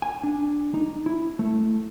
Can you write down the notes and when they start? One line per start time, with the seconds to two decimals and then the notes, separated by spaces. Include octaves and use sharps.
0.02 G#5
0.24 D4
0.74 D#4
1.06 E4
1.39 A3